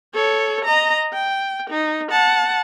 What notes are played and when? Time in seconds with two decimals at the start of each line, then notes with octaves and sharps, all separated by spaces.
0.14 A4 C#5
0.65 D#5 A#5
1.13 G5
1.70 D#4
2.11 F#5 A5